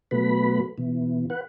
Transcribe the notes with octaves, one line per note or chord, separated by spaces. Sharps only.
B2 F#3 A3 B4 B5
B2 E3
B4 F#5